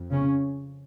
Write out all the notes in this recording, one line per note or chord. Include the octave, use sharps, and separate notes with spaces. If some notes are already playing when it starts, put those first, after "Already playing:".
Already playing: F2
C#3 C#4